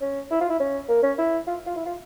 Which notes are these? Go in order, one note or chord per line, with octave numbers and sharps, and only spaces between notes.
C#4
E4
F4
E4
C#4
A#3
C#4
E4
F4
F4
E4
F4